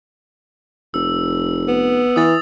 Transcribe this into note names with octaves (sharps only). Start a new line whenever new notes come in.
F1 E6
B3
E3 D#6 A6